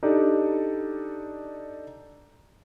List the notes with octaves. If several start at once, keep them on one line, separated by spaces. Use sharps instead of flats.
D4 D#4 G4 A4 D5